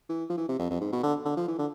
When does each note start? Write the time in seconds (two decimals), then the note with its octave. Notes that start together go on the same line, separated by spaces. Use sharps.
0.09 E3
0.29 F3
0.37 E3
0.49 C3
0.59 F2
0.71 F2
0.81 G#2
0.92 B2
1.03 D3
1.25 D3
1.37 F3
1.48 E3
1.59 D3